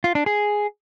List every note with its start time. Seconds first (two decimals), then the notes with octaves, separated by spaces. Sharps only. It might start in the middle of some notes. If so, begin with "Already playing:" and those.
0.04 F4
0.15 D4
0.26 G#4